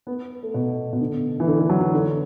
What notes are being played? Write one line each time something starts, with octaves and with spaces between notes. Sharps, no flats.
B3
A3
B2
B2
D3
E3
D3
D3
F#3
E3
D3